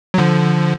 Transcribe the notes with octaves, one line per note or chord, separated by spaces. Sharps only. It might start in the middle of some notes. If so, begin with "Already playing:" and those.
F#3
D3 F3